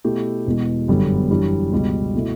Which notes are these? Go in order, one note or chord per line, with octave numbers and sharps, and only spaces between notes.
B2 A3 E4 G4
E1 E2 B2
G1 F#2 D3 G3 B3
F#2 E3 G3 D4
C#2 B2 G3
B2 A3 E4